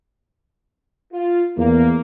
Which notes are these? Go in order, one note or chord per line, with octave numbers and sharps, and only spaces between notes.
F4
E2 A#3